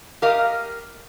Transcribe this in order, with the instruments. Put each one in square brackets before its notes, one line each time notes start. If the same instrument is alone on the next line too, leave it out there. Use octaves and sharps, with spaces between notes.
[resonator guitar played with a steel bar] G4 A#4 D#5 F5